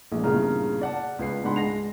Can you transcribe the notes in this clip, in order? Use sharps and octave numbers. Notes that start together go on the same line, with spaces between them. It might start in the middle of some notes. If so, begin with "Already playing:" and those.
A#1 E3 G#3
E2 G2 A#2 C#3 A#5 F6
D5 F#5 A5
C#2 B4 C7
C#2 G#2 D4 F#5 B5 C6
G#3 A#6 C7 F7